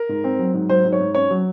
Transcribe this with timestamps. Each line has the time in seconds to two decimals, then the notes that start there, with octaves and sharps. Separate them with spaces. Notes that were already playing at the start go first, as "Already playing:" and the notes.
Already playing: A#4
0.09 G#2
0.24 C4
0.39 F#3
0.54 G#2
0.69 F#3 C5
0.85 G#2
0.93 C#5
1.00 G#2
1.15 C#4 C#5
1.30 F#3